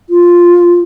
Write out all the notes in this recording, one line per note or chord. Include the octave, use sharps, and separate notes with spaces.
F4